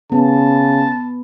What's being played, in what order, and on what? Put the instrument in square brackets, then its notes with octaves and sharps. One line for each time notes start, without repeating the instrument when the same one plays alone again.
[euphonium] C#3 [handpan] B3 [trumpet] A5